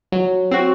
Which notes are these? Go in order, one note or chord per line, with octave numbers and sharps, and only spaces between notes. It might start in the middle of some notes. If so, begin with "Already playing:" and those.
F#3
C4 F#4